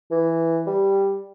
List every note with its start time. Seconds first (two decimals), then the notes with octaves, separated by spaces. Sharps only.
0.11 E3
0.67 G3